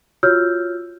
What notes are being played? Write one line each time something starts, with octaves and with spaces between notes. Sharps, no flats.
F4 F#4 C#5 E6 F6 G6